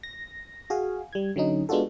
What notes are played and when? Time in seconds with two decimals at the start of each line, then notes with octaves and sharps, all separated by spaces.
0.03 A#6
0.70 F#4 G#4 F5 G#5
1.13 G3 G#6
1.36 D3 F#3 C#4 D#4
1.69 G#3 B3 D4 F4 F#4 A4